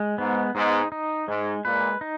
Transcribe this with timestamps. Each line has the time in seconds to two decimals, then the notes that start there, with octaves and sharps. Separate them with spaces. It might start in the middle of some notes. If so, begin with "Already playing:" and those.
Already playing: G#3
0.18 G#2 B3
0.55 G#2 D#4
0.92 D#4
1.28 G#2 G#3
1.65 A#2 B4
2.01 D#4